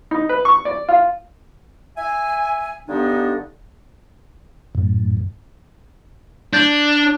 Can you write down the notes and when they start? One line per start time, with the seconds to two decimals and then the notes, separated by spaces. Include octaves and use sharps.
0.11 D#4
0.29 B4
0.45 C#6
0.65 D5
0.89 F4
1.97 E5 G#5
2.87 G2 D3 B3 D4 D#4
4.75 F#2 A2
6.53 D4 G6 A6